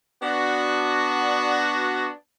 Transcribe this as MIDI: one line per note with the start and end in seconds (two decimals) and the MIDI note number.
0.22 2.10 59
0.22 2.10 62
0.22 2.10 66